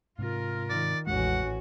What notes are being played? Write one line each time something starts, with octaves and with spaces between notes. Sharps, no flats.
G#2 C3 F4 A#4
D#3 D5
A1 E2 G#3 C#4 F#4 F#5